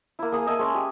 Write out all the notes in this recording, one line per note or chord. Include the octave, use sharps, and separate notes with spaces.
A#3 E4
A#3 G#4 D#6
D#5 E5 G#5 A5
G#3 C#4 G#5
G4